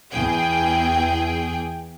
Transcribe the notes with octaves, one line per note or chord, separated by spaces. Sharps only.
E2 G#4 G5